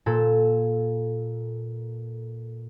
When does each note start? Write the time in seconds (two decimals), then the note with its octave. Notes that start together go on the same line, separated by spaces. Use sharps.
0.06 A#2 A4